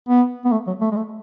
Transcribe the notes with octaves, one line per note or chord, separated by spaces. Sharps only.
B3
B3
A3
F#3
A3
G#3
A3